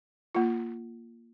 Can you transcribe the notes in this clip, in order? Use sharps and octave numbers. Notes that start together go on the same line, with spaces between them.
A#3 F4